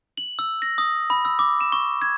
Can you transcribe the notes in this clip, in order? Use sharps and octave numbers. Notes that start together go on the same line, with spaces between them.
F#7
E6
A#6
D#6
B5
E6
D6
E7
C#6
G#6